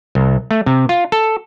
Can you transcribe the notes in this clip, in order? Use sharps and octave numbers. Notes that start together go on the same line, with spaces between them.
C2
A3
C3
F4
A4